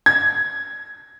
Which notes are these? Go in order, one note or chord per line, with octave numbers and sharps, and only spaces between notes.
G#6